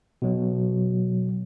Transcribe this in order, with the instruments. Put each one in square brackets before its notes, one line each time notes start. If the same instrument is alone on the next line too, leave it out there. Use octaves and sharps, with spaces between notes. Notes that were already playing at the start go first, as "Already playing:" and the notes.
[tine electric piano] B2 F#3